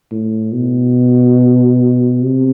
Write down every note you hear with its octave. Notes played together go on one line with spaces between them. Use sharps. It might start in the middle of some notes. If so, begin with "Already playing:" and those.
A2
B2
C3